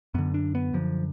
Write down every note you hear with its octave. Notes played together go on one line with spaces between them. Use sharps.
F#2 D3 B3
D4
B3
F#2 D3 F3